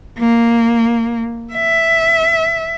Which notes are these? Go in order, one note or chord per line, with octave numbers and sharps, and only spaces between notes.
A#3
E5